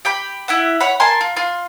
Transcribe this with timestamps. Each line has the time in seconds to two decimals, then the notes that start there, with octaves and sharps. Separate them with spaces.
0.05 G4 G5 B5
0.48 E4 E5 F#5
0.80 C#5 F#5 B5
1.00 A#4 G#5 A5 C6
1.21 F4
1.36 F4 C6